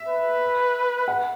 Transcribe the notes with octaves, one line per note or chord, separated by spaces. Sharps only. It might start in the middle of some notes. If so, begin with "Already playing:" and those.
Already playing: E5
B4
F#5